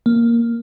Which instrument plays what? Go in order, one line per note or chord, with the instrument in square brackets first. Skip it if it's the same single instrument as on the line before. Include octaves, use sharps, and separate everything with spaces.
[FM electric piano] A#3